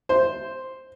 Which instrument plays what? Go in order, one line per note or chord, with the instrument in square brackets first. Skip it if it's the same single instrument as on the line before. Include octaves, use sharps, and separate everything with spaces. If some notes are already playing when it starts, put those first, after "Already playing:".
[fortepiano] C5